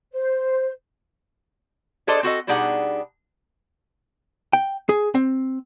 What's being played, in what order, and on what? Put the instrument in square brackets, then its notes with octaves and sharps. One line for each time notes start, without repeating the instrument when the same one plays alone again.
[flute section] C5
[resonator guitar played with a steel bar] D4 G#4 A4 C5 D5 D#5
C4 F#4 A4 D#5
B2 G3 D4 D#4 G#4 F#5
[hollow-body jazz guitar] G5
G#4
C4